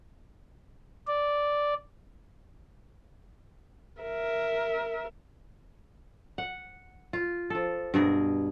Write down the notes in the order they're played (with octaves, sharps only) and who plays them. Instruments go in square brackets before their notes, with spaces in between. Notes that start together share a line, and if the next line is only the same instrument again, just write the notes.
[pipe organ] D5
[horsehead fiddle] A#4 E5
[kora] F#5
F4
F3 A4
G2 B2 G#4 A#4